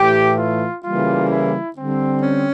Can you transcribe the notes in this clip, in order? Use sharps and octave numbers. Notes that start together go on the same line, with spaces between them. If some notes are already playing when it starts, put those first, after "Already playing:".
Already playing: A2 E3 A3 G4
F4
C#3 E3 G3 A#3 F4
E4
D3 G3 C4
C#4